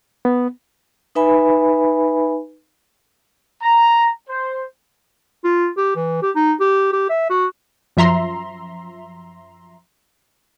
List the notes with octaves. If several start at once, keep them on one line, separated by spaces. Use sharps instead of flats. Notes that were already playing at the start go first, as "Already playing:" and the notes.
B3
D#4 B4 E5 G#5 B5
A#5
C5
F4
G4
E3
G4
D#4
G4
G4
E5
F#4
F#2 F3 E5 A#5 C6